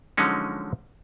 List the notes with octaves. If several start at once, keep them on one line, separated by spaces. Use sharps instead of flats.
D3 F3 F#3 G#3 C#4 D#4